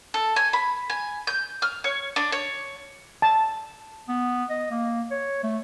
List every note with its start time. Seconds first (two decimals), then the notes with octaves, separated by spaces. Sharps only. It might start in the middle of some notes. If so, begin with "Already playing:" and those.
0.14 A4
0.36 G#5
0.53 B5
0.90 G#5
1.27 G6
1.62 F6
1.84 C#5
2.16 D4
2.32 C#5
3.22 A5
4.08 B3
4.50 D#5
4.71 A#3
5.11 C#5
5.43 A3